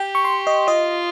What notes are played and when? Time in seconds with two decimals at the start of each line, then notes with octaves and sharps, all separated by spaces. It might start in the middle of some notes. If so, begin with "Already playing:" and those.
Already playing: G4 G5
0.15 C#6
0.25 C6
0.47 D#5
0.67 F4 D#5